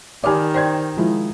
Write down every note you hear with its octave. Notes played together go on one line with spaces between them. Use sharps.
D#3 G4 D5 G#5 B5 D6
C5 D5 G5 C6 G#6
F3 G#3 E4